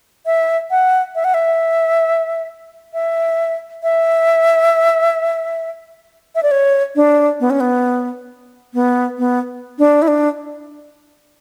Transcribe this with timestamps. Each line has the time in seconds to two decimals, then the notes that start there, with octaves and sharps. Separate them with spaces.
0.26 E5
0.71 F#5
1.15 E5
1.24 F#5
1.34 E5
2.94 E5
3.83 E5
6.35 E5
6.43 D5
6.51 C#5
6.96 D4
7.40 B3
7.50 C#4
7.60 B3
8.74 B3
9.18 B3
9.79 D4
10.02 E4
10.08 D4